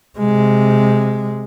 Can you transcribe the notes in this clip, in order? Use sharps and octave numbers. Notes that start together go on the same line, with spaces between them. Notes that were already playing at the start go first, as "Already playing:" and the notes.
C3 G#3